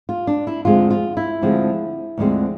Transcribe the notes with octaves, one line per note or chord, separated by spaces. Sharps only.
F4
D4
E4
D2 D3 F3 G#3 C4 F4
F4
E4
D2 D3 F3 G#3 C4
D2 D3 F3 G#3 C4